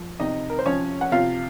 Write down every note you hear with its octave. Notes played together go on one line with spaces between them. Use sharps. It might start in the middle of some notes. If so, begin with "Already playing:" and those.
Already playing: F3
C3 D#4 D#5
A#4
C5
F3 C#4 C#5
F#5
C3 F4 F5